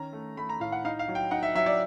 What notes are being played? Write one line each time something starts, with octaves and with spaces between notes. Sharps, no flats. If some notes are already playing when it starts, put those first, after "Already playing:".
Already playing: D#3 C#4 A#5
A3
A3 B5
A#5
A2 F5
F#5
D#4 F5
F5
F#3
G5
D#4 F#5
E5
F#3 E5
D5